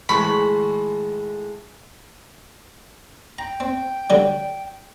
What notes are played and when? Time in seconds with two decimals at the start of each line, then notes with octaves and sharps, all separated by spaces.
0.09 A2 D#3 G#3 F#4 G#4 A5 B5 C#6
3.38 G5 A#5
3.60 C4
4.10 D3 F#3 G3